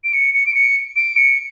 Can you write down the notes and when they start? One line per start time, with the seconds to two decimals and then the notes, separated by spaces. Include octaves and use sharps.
0.04 D7
0.13 C#7
0.34 C#7
0.46 D7
0.54 C#7
0.96 D7
1.16 C#7